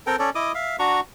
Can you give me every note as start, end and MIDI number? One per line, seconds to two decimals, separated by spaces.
0.07 0.16 60
0.07 0.16 69
0.07 0.16 70
0.07 0.16 79
0.19 0.30 61
0.19 0.30 69
0.19 0.30 74
0.35 0.52 64
0.35 0.52 75
0.35 0.52 86
0.35 0.52 87
0.55 0.76 76
0.55 0.76 77
0.79 1.00 62
0.79 1.00 66
0.79 1.00 82
0.79 1.00 85